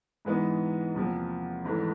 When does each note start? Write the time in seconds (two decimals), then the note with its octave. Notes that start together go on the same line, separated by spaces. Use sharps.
0.25 G#2 E3 G#3 B3 D#4
0.94 E2 C3 F3 A#3
1.64 G#1 G#2 E3 A3